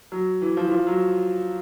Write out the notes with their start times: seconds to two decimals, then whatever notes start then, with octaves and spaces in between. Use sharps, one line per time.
0.12 F#3
0.42 E3
0.57 F3
0.67 E3
0.72 F3
0.87 F#3